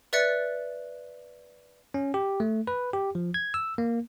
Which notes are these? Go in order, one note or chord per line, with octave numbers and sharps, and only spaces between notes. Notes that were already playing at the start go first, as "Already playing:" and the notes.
B4 D5 E5 F#6 A6 C#7
C#4
G4
A3
B4
G4
F3
G#6
E6
A#3